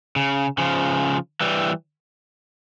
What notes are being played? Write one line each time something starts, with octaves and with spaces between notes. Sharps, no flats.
C#3
C#3 F3
E3 G3